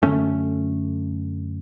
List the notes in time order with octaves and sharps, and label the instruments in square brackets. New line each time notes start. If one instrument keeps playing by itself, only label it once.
[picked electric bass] F#2 D3 A3 C#4